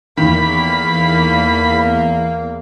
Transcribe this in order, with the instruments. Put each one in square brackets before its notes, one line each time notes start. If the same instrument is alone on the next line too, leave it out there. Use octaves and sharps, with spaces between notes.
[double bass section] E2 [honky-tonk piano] D#3 [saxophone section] A#3 [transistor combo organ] B5